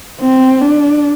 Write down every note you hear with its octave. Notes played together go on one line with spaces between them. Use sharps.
C4
D4